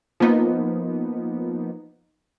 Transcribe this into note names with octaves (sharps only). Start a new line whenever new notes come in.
F3 A#3 B3 D#4